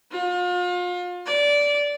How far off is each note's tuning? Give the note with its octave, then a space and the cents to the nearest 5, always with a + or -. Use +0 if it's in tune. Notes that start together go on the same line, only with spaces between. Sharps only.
F4 +35
D5 -15